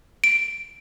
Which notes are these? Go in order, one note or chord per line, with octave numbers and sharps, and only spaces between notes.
D7